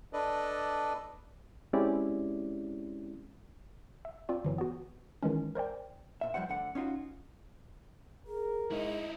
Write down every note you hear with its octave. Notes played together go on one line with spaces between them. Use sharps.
D4 A4 B4 D5 D#5
G#3 C4 C#4 E4 G4 D5
E5
C4 F4 D5
G1 E3 F#3
B3 F#4
D#3 E3 G#3 C#4
A#4 C5 D5 G5
A#2 E5
G2 B2 F3 G3 C5 F#5
D2 D3 F#5
C#4 D#4 F4 F#4
G#4 A#4
G#2 D#4 E4 D#5